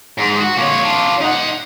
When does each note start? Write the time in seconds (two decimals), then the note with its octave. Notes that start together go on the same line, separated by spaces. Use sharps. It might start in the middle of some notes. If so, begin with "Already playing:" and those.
0.19 G#2
0.41 F#4
0.57 A#2 C#5
0.84 D4 F4
1.21 D#4 F#5